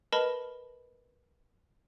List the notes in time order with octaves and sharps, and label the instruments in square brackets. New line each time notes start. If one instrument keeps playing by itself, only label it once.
[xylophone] A#4 B4 D#5 A5 B5